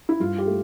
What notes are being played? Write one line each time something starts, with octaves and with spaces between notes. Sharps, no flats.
E4
G2 F4
G4
A3